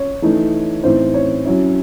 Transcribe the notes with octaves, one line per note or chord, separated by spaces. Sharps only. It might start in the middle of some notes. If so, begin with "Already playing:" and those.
Already playing: C#5
E3 A3 D#4
A2 E3 C4 D#4 C5
C#5
F#3 C#4 E4